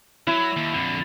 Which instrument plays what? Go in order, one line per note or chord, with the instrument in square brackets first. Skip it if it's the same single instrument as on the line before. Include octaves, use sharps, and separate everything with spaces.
[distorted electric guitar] F#3 [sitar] E4
[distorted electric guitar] D#2
F2 D3